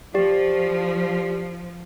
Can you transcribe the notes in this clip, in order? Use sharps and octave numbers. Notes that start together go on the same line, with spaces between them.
F3 G4 D5